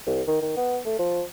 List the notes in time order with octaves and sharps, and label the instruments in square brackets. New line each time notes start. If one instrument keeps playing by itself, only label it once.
[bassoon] C2
D#3
D#3
B3
A3
F3